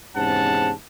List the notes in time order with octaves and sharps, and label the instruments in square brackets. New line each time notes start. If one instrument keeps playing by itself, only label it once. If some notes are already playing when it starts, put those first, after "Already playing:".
[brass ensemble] E2 G#2 C3 C#4 F#5 A5